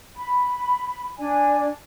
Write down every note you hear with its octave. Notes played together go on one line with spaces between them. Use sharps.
B5
D4 D5 G#5